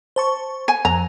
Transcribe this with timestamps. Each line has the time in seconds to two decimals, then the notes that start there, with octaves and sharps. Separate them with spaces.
0.16 C5 A5 C#6
0.68 G#5
0.85 F2 A#5